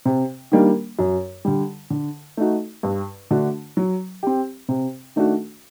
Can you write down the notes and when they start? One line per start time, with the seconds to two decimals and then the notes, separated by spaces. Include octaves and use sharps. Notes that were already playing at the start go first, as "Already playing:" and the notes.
0.05 C3
0.52 D#3 G3 A#3 D4
0.99 F#2
1.45 D3 G3
1.90 D3
2.37 A3 D#4 F#4
2.83 G2
3.31 D3 A3 D4 F#4
3.77 F#3
4.23 C4 G4
4.69 C3
5.16 D#3 A3 D4 F#4